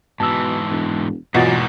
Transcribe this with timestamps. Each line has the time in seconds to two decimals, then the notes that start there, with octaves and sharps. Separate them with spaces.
0.20 G#2 B2 E3 A5 E6
0.70 E1
1.34 E2 G#2 B2 E3 F#3 A#3 F4 A6